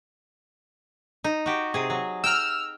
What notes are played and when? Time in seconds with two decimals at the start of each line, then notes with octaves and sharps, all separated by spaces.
1.24 D#4
1.46 F#4 G4
1.74 C3 G#4
1.90 F#3
2.24 G5 A#5 E6 F6